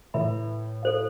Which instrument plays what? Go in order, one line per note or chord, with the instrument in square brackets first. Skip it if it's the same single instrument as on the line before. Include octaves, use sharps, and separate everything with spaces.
[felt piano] A2 [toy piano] B4 E5 B5
[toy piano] A4 C5 F5